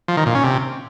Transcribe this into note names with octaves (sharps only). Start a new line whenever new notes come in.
F3
D#3
A#2
C#4
C3